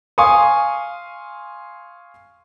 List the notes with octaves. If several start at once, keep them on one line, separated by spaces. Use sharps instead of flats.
F5 G#5 C6 C#6 D#6